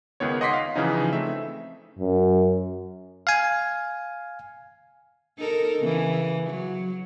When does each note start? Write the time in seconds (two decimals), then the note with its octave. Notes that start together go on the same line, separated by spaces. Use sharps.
0.20 C#2 D#3 B3 C#5
0.41 D#5 F#5 C6 D6 B6 C7
0.53 F5
0.76 C#3 E3 F3 C#4 D#4
1.13 A3 C4 E5
1.99 F#2
3.27 F5 G#5
5.39 D#4 A4 A#4
5.79 C#3 E3
6.50 F#3